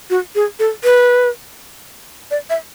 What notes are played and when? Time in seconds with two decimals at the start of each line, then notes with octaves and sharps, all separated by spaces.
0.10 F#4
0.35 G#4
0.59 A4
0.84 B4
2.31 D5
2.50 E5